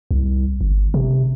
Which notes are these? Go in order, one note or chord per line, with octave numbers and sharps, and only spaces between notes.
C2
G1
C3